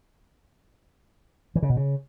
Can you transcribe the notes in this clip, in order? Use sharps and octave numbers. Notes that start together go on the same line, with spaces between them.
E3
C#3
B2
C#3